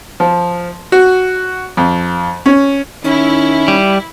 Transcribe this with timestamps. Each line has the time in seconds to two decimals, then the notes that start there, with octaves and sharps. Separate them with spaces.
0.20 F3
0.92 F#4
1.77 F2
2.46 C#4
3.04 D#3 C#4 E4
3.68 G3